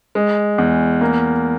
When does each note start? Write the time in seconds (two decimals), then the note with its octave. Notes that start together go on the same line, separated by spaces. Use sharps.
0.15 G#3
0.58 E2
1.01 A#3